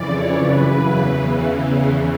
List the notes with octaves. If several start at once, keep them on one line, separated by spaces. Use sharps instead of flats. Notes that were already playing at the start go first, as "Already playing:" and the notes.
Already playing: F2 C#3 E3 D5
C#5
F#2 C#3 E3 B4
E2 C#3 E3